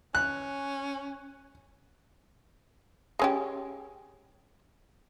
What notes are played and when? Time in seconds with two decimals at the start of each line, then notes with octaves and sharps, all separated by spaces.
0.15 C#4 F#6
3.19 G#3 C#4 G4